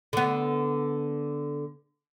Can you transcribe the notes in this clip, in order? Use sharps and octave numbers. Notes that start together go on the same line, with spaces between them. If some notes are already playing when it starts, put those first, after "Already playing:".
D3 B3